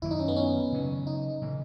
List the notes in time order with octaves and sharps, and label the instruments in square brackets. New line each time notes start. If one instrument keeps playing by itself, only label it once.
[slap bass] F#2 D#3 F#3 A#3 [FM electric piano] E4
[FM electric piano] D#4
C#4
B3
C#4
[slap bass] C#3 F#3 C#4
[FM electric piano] D#4
[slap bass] C#3 E3 A#3